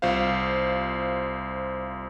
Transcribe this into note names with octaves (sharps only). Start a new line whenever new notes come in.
C2 F4 C5 F5